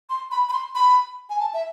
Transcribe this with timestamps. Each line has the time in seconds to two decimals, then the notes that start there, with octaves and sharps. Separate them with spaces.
0.10 C6
0.31 B5
0.49 B5
0.53 C6
0.75 B5
1.30 G#5
1.40 A5
1.54 E5